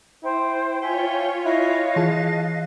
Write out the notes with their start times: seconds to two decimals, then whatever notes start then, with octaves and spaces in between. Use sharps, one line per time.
0.23 E4 C5 G5
0.82 F4 C#5 E5 G5 G#5
1.45 E4 D#5 F5 F#6
1.96 E3 G#4 A5